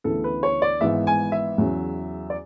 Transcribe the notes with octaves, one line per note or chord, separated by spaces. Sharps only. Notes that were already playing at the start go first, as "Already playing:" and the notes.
D2 C#3 E3 B3 E4 A4
B4
C#5
D5
G#1 G#2 E3 B3 E5
G#5
E5
E2 C#3 F#3
D5